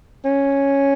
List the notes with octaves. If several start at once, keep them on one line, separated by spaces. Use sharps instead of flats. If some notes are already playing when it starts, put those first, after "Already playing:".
C#4